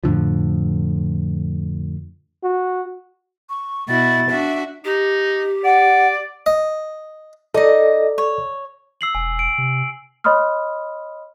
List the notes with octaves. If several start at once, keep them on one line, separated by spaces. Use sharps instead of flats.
F2 A2 D3 F3
F#4
C#6
B2 E4 F#4 A6
D4 F#4 E5
D#4 G4
D5 F#5
D#5
D#4 A4 D5 D#5
C#5
E6 C7 F#7
E1 G#5
D7
C3
C#5 D#5 B5 C6 D#6 F6